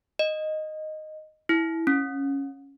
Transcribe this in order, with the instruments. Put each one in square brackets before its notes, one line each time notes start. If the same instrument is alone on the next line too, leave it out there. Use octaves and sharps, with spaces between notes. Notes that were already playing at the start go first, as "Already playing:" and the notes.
[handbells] D#5
E4
C#4